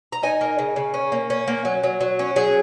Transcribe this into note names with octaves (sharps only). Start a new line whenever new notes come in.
A#5
D#4 D#5 G#5
A#3
C#3
C#3
C#4
A#3
C#4
A#3
F#3
F#3
F#3
C#4
F#3 G#4